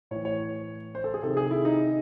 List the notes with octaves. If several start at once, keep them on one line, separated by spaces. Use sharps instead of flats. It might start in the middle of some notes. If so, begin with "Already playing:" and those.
A2 E3 C#5
C#5
C5
A4
G#4
C3 D#3 A4
G#4
E4
D#4